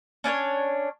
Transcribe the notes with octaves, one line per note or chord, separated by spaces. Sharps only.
C#4 D4 B4 C#5